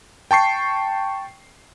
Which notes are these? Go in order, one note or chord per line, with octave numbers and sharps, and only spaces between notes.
G5 A5 C#6 C7